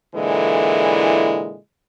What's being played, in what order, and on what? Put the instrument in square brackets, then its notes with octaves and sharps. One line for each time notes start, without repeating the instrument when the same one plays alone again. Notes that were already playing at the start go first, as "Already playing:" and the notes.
[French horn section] A#2 D3 E3 G#3 E4 A4